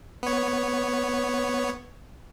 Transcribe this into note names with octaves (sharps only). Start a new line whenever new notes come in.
B3 C#5